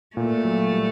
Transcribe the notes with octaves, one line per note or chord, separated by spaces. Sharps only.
A#2 A3
F#3
G3